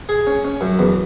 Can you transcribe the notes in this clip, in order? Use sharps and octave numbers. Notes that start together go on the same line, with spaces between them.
G#4
C#4
C#4
F#2
E2